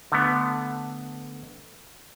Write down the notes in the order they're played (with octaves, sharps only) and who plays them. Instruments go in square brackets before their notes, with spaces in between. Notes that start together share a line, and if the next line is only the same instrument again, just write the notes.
[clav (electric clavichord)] D3 A3 B3